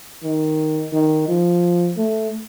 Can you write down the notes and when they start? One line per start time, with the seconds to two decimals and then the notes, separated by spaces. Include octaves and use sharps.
0.24 D#3
0.93 D#3
1.28 F3
1.97 A3